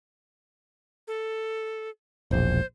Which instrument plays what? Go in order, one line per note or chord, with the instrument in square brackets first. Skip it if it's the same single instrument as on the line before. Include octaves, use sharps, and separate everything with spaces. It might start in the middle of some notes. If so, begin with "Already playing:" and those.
[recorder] A4
[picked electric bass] E1 A#1 [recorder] C5